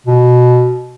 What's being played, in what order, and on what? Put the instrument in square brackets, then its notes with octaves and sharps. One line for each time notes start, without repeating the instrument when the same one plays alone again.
[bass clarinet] B2